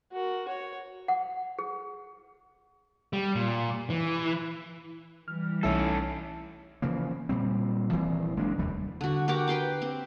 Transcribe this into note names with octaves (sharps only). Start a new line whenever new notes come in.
F#4 A#4
C#5
F#5
G#4
G3
A#2
E3
E3 G3 F6
B1 A3 C#4 D#4 E4 A4 E5 E6
C#3 E3 F3 A#3
A#2 G3 C4
D#1 E3 C4
F#1 G#3 A#3 D4
F1 D#2 G3 A3
D3 F#4
F#4 G4 A#4 D6
B4 G5 C6 D6
C4